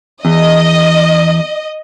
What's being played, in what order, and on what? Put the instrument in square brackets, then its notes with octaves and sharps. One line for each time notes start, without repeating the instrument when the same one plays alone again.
[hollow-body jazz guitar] E2 [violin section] D#5